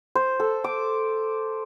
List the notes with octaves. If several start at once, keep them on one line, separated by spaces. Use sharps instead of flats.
C5
A4
D6